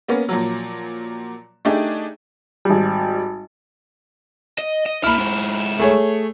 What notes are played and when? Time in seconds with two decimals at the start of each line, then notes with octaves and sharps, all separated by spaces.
0.08 A#3 B3 C#4
0.29 A#2 F3 F#3
1.65 A3 D4 D#4 G4 G#4
2.65 G#1 G3
4.58 D#5
4.86 D#5
5.04 A#3 E4 B5 F6
5.18 G#2 E4
5.79 A3 G#4 C#5